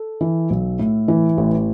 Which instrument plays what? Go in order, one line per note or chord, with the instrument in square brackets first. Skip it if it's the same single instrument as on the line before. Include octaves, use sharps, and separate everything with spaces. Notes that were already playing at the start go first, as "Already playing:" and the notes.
Already playing: [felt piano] A4
E3
B1
A2
E3
A1